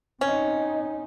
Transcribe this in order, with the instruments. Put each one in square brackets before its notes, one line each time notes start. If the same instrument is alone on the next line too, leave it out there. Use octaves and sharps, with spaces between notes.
[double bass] C4 D#4 [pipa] C#4